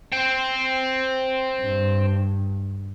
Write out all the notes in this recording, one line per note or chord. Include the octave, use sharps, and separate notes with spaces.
C5 G5
G2